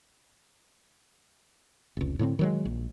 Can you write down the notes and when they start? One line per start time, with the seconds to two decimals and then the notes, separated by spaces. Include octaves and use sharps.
1.97 F1 C#2
2.19 A2 D3 B3 C4
2.39 D#3 F#3 G#3
2.65 A#1